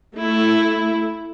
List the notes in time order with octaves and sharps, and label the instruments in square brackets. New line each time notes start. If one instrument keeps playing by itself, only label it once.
[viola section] A3 E4